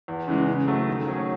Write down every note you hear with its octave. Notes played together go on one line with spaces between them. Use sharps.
E2
C#3 E3 G#3
C#3
F#3 A3
D#3
F#3 C#4 G#4